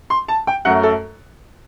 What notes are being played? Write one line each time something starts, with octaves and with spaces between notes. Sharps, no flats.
C6
A5
G5
F#2 F#3 A3 F#5
A4